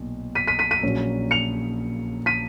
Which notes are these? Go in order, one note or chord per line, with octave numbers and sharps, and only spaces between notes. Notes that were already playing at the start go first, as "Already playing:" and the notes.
Already playing: B1 A#2
B6 D#7
B6 D#7
B6 D#7
B6 D#7
A#1 A#2 F#3 A#3 C#4
C#7 F7
B6 D#7